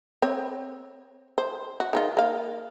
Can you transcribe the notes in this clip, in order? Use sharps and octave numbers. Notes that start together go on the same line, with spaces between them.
C4 C#5
C5
F#4
D#3 G#3 F4
A#3 F5